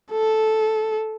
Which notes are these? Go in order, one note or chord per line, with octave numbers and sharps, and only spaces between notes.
A4